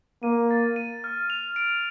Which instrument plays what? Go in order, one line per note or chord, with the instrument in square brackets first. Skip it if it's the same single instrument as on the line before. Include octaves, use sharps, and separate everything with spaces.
[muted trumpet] A#3 [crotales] D#7
[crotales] A6
D#7
F6
F7
D7